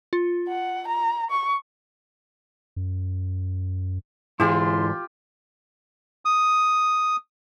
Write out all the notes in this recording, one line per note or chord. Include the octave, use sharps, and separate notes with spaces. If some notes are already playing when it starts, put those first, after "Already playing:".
F4
F#5
A#5
C#6
F#2
G#2 E3 E4 F4 G4 G#4 C6
D#6